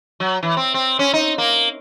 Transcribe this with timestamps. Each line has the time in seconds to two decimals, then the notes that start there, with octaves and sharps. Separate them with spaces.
0.20 F#3
0.43 E3
0.57 C4
0.74 C4
0.99 C#4
1.13 D#4
1.38 A#3